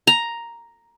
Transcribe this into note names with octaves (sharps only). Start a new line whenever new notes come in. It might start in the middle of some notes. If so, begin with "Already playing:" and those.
A#5